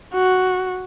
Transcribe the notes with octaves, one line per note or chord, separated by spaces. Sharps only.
F#4